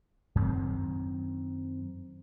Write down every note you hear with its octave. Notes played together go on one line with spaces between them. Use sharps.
F#2 D#3 C4